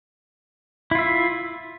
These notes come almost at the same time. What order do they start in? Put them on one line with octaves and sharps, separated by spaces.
E4 F4 E5